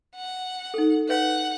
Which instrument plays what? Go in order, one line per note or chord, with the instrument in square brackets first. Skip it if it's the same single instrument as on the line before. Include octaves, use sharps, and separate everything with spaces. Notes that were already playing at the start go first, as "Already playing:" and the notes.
[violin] F#5
[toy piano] D#4 A4
[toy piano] B4 C#5 F5 [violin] F#5